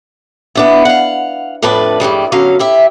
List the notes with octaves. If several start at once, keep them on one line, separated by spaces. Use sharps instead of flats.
B3 D4 E4
F5 F#5
F2 A2 D4 B4 A5
G2 E3 G3 G#3
B2 D3 F#3 C#4 F5
E4 G4 E5